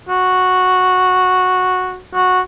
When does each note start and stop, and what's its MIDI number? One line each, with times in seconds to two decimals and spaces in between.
0.09 1.99 66
2.15 2.40 66